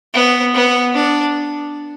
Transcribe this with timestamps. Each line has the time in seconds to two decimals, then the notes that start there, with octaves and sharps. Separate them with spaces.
0.14 B3
0.54 B3
0.95 D4